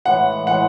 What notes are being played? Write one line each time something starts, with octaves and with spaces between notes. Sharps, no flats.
A2 E3 G#3 F#5
A2 E3 G#3 F#5